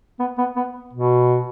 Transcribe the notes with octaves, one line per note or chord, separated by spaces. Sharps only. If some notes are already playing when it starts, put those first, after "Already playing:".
B3
B3
B3
B2